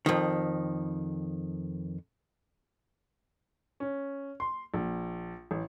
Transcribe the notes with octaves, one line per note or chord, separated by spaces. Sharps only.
F2 D#3
C#4
C6
A#1
A1